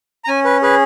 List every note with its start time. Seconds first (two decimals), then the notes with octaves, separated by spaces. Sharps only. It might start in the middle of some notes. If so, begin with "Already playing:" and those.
0.24 A#5
0.28 C#4 G#5
0.45 B4
0.62 G#4 B4